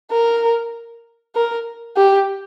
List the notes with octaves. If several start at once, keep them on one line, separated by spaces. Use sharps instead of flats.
A#4
A#4
G4